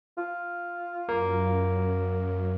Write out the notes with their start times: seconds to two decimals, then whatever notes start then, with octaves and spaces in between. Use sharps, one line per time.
0.18 F4
1.09 F#2 A#3